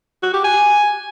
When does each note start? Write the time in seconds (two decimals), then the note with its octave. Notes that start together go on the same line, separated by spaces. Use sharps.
0.23 F#4
0.34 G4
0.44 G#5